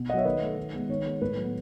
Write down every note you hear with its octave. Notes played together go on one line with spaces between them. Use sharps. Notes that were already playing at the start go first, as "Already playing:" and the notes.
Already playing: B2
F#3 B3 C#5 D#5 E5 F#5
D#3 B4 D#5
A3
D#3
G#3 B3
D#3 C#5
G#3 B3
A2 B4
F#3 B3